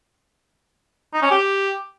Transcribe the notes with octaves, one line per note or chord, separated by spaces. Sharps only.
D#4
C#4
G4